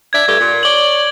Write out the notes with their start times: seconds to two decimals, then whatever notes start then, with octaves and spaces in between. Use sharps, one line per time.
0.13 D4 D5 E5 G#6
0.27 G2 A3 G4
0.39 A#2
0.63 C#5 D5 F#7 G7